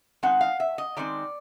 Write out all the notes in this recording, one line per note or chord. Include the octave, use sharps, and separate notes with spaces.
D#3 G#3 C4 F#5
F5
E5
D#5
D#3 G#3 C4 D5